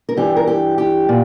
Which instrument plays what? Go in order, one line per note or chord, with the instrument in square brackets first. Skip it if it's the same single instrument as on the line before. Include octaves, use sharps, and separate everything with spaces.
[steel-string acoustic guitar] A#4
G2 E3 G4
A#4
G4
G4
A#2